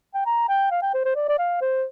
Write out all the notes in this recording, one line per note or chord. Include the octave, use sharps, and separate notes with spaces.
G5
A#5
G5
F5
G5
C5
C5
D5
D5
F5
C5